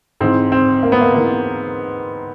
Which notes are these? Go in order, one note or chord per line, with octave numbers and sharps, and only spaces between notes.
G#2 E3 C4
C4
A#3
B3
A#3
E3 A#3